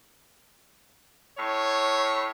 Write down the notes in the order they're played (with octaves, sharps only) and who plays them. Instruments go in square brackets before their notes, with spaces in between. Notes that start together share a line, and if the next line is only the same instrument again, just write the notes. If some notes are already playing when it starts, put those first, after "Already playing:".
[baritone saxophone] A2 [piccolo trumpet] C#5